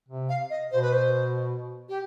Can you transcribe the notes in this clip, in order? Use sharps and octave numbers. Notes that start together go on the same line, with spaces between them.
C3
F5
D#5
B2 C5
B4
C5
G4